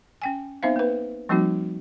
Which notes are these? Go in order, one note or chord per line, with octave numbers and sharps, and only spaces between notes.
C#4 G5 G#5
B3 C4 D#4 C5 E5 F5
A#3 B4
F3 G3 A#3 C4 D#4 F#4